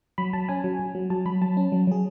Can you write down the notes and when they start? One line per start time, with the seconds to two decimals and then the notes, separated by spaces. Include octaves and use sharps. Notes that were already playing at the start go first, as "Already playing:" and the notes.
0.18 F#3 B5
0.33 F#3 A5
0.49 C#4 G#5
0.64 F#3
0.79 F#3
0.95 F#3
1.10 F#3 A5
1.26 F#3 B5
1.41 F#3 A5
1.57 C#4
1.72 F#3
1.87 F#3 G#4